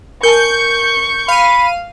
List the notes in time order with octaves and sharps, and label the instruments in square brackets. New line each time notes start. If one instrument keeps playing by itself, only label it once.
[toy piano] A#4 G#5 A5 [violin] C#6 [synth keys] G6 C#7
[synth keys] F5 D#7 [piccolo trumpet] B5